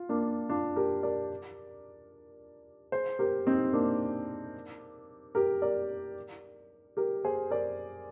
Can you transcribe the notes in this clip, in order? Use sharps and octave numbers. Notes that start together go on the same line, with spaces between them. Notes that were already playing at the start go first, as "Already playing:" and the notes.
Already playing: F4
A#3 D4
D4 F4
G4 A#4
A#4 D5
G#4 C5
G4 A#4
C4 D#4
A#3 D4
G4 A#4
A#4 D5
G4 A#4
G#4 C5
A#4 D5